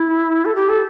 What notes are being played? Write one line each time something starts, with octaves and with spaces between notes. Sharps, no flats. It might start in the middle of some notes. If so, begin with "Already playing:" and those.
Already playing: E4
A4
G4
A4